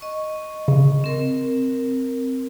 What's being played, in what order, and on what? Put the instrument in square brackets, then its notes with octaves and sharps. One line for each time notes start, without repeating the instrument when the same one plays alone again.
[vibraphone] D#5 C#6
[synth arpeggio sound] C#3
[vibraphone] C4 A#4